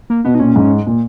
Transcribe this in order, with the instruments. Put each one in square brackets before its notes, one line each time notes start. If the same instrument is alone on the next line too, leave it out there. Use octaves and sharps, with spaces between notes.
[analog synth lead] A#3
[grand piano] B2 [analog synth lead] B3
[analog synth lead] D#4
[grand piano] A#2 [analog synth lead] C#4
[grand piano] G#2
A#2